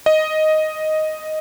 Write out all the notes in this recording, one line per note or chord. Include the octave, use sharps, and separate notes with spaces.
D#5